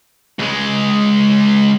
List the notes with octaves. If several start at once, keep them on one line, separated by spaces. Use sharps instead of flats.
C#2 G#3